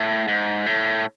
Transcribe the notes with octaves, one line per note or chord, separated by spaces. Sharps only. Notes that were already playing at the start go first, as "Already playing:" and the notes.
Already playing: A2
G#2
A2